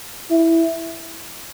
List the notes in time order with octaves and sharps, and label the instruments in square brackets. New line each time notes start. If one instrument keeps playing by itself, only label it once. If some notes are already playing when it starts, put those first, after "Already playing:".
[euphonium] E4